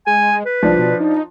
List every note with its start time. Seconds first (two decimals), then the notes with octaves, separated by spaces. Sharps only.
0.07 G#3 G#5
0.45 B4
0.63 C2 F3 D4
0.78 B2
1.00 D#4